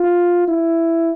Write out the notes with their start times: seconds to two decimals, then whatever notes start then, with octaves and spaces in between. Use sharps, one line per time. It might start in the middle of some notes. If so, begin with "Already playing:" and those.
Already playing: F4
0.48 E4